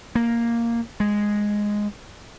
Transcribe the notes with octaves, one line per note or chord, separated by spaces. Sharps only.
A#3
G#3